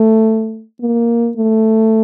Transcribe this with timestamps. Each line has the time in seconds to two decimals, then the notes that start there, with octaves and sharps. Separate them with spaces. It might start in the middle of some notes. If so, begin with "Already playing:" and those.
Already playing: A3
0.81 A#3
1.37 A3